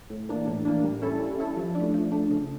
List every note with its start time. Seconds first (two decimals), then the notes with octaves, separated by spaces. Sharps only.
0.10 A2
0.29 E3 A#3 D4
0.47 A2
0.65 E3 A#3 D4
0.84 G3
1.02 C#4 E4 A4
1.20 G3
1.38 C#4 E4 A4
1.57 F3
1.75 A3 D4
1.94 F3
2.12 A3 D4
2.30 C#3